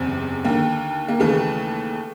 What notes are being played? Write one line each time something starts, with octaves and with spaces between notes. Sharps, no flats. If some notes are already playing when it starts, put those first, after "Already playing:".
Already playing: F#1 E2 C3 C4
D#2 D3 A#3
A#3
D#2 C#3 E3 A3